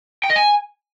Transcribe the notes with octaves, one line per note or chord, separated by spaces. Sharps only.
G5
D#5
G#5